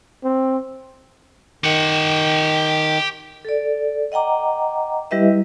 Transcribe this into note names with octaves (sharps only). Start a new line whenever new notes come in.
C4
D#3 G4 F#5
A4 D5
D#5 F#5 G5 A#5 D6
G3 E4 G4 B4 D#5 E5